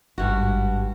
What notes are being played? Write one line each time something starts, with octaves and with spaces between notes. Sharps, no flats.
G#1 G2 F#4